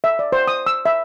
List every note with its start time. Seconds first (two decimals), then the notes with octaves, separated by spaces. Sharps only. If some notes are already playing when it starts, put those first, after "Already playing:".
0.04 E5
0.19 D5
0.32 C5
0.48 D#6
0.66 E6
0.86 E5